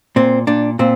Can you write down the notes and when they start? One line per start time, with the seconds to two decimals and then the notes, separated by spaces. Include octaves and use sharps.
0.16 A#2 C4
0.47 A#2 D4
0.79 A#2 C4